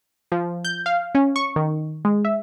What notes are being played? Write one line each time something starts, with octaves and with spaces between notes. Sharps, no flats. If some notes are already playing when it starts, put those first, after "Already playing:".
F3
G6
F5
C#4
C#6
D#3
G#3
E5